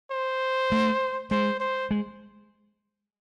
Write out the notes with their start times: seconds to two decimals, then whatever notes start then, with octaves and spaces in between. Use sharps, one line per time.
0.12 C5
0.72 A3
1.31 G#3 C5
1.60 C5
1.91 G#3